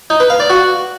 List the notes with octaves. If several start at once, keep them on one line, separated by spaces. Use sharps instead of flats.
D#4
B4
F5
D5
F#4